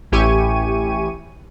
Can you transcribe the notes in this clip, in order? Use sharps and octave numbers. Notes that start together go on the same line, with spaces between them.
A1 E4 G4 G#5 C#6 D#7